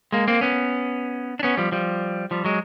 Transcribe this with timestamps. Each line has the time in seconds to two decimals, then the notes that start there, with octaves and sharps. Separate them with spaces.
0.12 G#3 A#3
0.28 A#3 C4
0.41 B3 C#4
1.39 D4
1.43 B3 C#4
1.57 F3 G3
1.72 F3 G3
2.31 F3 G3
2.45 F#3 G#3